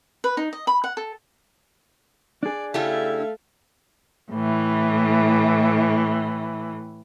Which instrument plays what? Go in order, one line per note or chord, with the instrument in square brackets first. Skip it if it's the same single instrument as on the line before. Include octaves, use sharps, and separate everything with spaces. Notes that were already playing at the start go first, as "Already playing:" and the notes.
[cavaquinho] B4
D#4
D#5
B5
F#5
A4
[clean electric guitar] D4 G#4 [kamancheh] D5
[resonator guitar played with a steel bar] C#3 E4 G4 [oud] A3 [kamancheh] E5 F5
[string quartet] A2 E3